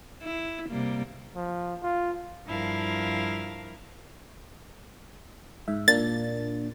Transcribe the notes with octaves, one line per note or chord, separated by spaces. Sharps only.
E4
C3 G3 A#3
F3
F4
G2 F3 E4 A#4 F5
G#2 E5
A#2 A#3 D4 A6